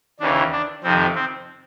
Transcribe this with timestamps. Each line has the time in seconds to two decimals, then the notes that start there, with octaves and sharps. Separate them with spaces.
0.20 D#2 C#3 E3 D4
0.52 D4
0.84 F2 C3 D#3 C4
1.15 C4